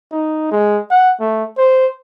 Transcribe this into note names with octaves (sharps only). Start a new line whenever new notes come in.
D#4
G#3
F#5
A3
C5